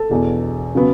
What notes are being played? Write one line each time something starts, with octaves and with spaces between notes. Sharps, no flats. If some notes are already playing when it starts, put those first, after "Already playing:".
Already playing: A4
E1 E2 B2
C#3 F#3 B3